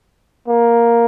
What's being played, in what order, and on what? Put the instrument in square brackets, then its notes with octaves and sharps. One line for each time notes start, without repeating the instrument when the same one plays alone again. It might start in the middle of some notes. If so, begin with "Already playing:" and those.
[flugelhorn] A#3